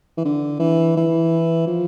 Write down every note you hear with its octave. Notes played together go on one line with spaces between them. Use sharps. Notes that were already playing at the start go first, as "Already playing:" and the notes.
E3
D3
E3
E3
F3